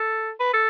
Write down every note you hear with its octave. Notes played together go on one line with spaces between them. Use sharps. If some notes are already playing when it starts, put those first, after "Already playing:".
Already playing: A4
B4
A4